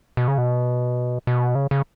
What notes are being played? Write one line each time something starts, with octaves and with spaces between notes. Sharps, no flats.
B2
C#3
B2
B2
C#3
C#3